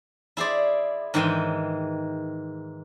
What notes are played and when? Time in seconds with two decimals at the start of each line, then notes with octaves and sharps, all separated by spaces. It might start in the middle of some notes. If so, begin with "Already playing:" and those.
0.37 E4 G#4 C5 D5
1.14 G#2 D#3 E3 C5 G5